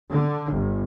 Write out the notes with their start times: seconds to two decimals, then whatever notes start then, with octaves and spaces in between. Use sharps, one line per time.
0.11 D3
0.52 G1